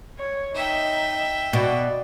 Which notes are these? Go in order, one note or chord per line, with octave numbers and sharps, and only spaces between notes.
C#5
D#4 E5 G5
B2 D5